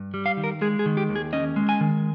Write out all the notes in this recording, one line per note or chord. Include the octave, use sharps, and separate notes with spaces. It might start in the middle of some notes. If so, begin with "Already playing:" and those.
Already playing: G2
G3
F5
D#3
A#4
G#3 G#4
G#4
D#3
G4
D#2
G#4
C#4 D#5
G#3
G#5
D#3